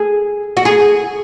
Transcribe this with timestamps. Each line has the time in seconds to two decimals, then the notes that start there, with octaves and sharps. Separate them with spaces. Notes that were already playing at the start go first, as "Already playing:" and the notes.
Already playing: G#4
0.57 F#4
0.65 G#4